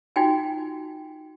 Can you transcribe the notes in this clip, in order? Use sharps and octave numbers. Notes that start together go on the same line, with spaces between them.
D#4 F4 F#4 G5 G#5